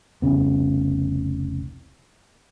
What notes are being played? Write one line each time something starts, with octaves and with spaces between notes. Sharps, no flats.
F1 C2 C#3 B3